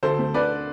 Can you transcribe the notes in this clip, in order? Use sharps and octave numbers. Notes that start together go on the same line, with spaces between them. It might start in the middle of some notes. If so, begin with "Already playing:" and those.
D2 A4 C5
A3
D3 B4 D5